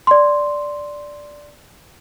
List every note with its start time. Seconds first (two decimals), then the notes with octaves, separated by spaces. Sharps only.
0.07 D5 C6